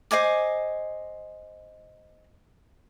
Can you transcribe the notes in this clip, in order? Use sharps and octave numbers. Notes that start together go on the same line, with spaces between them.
C5 D#5 G#5 D6